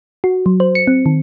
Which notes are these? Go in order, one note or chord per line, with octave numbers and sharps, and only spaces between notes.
F#4
F#3
C5
C#7
C4
D#3